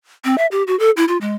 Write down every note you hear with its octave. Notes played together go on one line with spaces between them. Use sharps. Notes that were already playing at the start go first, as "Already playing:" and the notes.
C4
E5
G4
F#4
A4
E4
F4
G#3